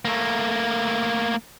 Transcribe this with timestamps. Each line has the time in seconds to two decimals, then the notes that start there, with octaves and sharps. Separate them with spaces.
0.05 A3 A#3